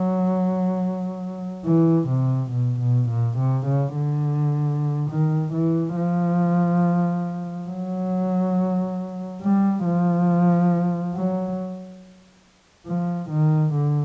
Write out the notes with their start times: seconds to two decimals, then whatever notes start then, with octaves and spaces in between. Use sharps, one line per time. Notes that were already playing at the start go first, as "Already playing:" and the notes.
Already playing: F#3
1.65 E3
2.08 C3
2.51 B2
2.80 B2
3.09 A#2
3.37 C3
3.66 C#3
3.95 D3
5.10 D#3
5.53 E3
5.96 F3
7.69 F#3
9.42 G3
9.84 F3
11.14 F#3
12.87 F3
13.30 D#3
13.73 D3